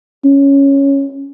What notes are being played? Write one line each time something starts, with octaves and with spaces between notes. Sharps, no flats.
C#4